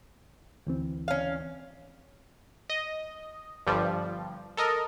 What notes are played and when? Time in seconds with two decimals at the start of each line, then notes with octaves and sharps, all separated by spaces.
0.67 D2 E3 C4
1.08 C#4 F5
2.70 D#5
3.67 G1 G2 F3 G3
4.57 A4 A#4 D#5